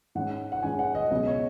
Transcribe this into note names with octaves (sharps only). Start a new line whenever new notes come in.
G#2 G#3 C#4 F#5
F#5
G#2 G#3 C#4 G#5
F#5
D#5
C#2 B2 F#3 D#5
C#5